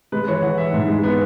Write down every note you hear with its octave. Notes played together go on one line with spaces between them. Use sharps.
G#3 B4
E3 C#5
E3 F#5
E3 E5
G#2
G#3
B3